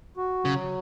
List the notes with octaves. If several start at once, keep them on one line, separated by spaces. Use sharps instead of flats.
F#4
C#3 F#3